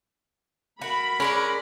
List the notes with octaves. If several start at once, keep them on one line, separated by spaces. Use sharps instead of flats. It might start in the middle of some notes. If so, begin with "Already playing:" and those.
F#4 A#4 B5
G#3 C#4 A#4 D5